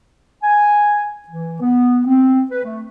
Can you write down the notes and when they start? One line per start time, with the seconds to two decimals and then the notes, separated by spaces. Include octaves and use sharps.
0.42 G#5
1.29 E3
1.61 B3
2.06 C4
2.51 B4
2.64 A3